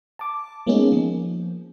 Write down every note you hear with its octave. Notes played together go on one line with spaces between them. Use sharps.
A5 D6
G#3 A#3 B3 C#4 D#4 G#4
F3